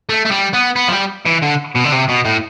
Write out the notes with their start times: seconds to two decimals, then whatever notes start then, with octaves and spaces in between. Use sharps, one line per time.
0.09 A3
0.26 A3
0.32 G3
0.54 B3
0.76 B3
0.88 F3
0.92 G3
1.26 E3
1.42 D3
1.75 B2
1.84 D3
1.92 C3
2.08 B2
2.25 A2